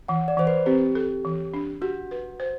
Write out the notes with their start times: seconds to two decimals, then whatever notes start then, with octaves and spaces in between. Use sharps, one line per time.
0.08 E3 F#5
0.28 D5
0.37 E3 C5
0.47 B4
0.66 C4 G4
0.95 A4
1.25 E3
1.54 D4
1.81 F#4 G4
2.11 B4
2.40 C5